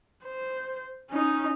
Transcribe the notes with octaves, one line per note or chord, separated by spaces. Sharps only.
C5
C#4 D#4